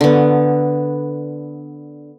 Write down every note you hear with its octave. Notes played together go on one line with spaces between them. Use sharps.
D3 B3